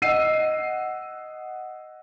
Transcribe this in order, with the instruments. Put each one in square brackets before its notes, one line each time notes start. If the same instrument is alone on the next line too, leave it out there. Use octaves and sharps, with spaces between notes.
[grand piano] D#5 F#5 E6 C7 D#7